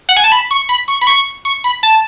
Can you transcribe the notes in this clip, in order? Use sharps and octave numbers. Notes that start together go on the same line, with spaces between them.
F#5
G#5
A5
B5
C#6
B5
C#6
B5
C#6
C#6
B5
A5